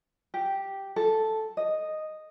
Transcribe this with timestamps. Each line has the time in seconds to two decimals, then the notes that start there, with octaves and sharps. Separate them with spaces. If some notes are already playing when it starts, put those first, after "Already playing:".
0.34 G4
0.96 A4
1.57 D#5